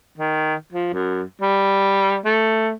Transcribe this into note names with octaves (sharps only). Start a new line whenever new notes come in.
D#3
F3
F#2
G3
A3